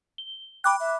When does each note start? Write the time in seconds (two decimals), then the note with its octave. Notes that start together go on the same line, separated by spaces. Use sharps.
0.18 G7
0.64 G5 B5 D6 F#6
0.80 E5